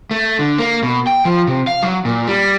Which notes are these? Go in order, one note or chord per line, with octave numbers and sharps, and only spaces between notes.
A3
D3
A#3
B2
G5
F3
C3
F5
F#3
A#2
G3